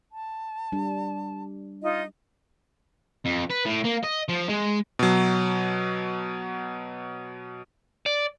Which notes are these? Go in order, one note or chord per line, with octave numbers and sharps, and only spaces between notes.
A5
G3 D4
D#4 F4 D#5
F2
B4
A2
A#3
D#5
F3
G#3
B2 F#3
D5